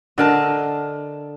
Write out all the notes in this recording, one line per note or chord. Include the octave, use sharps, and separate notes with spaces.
D3 A4 A#4 D#5 A5